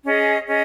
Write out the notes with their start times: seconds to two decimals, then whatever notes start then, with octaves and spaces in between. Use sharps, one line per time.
0.03 C#4 G#4 D#5
0.46 C#4 G#4 D#5